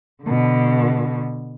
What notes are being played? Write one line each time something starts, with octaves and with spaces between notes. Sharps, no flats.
B2 D3